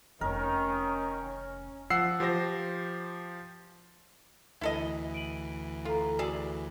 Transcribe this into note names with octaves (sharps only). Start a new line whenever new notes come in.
F1 D#3 C#4 A#4
F3 F#5 E6 C7
F3 G4 C5 A#6
D2 E3 E4 A4 D#5
D7 D#7 F#7
F4 A4 A#5
F#4 G#4 A4 D5